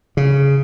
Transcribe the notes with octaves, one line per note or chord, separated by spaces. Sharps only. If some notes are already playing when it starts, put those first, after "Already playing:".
C#3